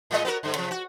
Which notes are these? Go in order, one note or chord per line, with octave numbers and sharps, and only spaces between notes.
A2 G#3 D#5
B3 F#4 A#4
G2 D3
C3 F3
F#4